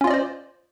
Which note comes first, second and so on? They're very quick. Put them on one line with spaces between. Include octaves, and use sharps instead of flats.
C#4 F4 D#5 D5 C5